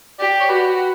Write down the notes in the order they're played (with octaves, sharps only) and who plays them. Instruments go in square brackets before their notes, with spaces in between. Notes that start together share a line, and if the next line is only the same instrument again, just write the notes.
[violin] G4 [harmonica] D5
[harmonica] D5
C#5
[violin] F#4 [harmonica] B4